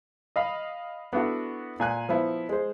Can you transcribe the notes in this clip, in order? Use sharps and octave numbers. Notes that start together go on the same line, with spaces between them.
D#5 F5 B5
B3 D4 E4 F#4 A4
A#2 G#5 F#6
F3 B3 E4
G#3 C5